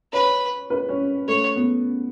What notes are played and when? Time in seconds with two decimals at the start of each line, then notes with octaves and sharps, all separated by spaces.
0.12 B4 C#5
0.70 B4
0.89 C#4
1.28 A3 C#5
1.56 B3